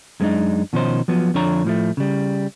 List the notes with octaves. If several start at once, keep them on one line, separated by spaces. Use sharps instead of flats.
F#2 G#3 B3 C4 D4 D#4
B2 D#3 F3 C#4 D#4 C5
F3 F#3 B3
F2 D3 F3 D4 C#5 A#5
A2 F3 A3
C#3 G3